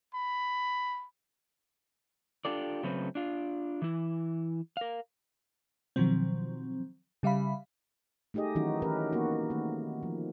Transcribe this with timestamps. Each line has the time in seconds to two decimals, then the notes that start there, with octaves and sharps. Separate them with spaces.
0.14 B5
2.45 D4 F4 G4 A4 D5
2.83 C#3 F#3 A3 C4 C#4 B4
3.15 D4 F4
3.82 E3 E4
4.77 A#4 F5
5.96 B2 D#3 F3 F#3 C4
7.23 C#3 G3 E5 F5 B5
8.34 A3 D#4 G4 G#4 D#5
8.55 D#3 E3 F#3 C#4 D#4 F#4
8.82 E3 C#4 G4 A#4 B4
9.13 E3 A#3 B3 F#4
9.50 D#3 A3 A#3
10.03 F3